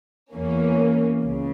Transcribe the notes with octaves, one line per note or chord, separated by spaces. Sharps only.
E2 E3 A#3 C#4
C#2 C#3